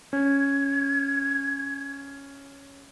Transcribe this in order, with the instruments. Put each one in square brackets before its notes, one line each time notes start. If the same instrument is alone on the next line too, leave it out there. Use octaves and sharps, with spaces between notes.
[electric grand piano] C#4 [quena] G#6